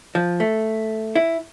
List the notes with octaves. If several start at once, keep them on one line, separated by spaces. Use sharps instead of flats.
F3
A3
E4